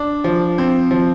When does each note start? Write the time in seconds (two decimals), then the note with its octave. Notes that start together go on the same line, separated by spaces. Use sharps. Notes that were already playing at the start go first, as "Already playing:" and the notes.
Already playing: D4
0.24 F3
0.58 C4
0.91 F3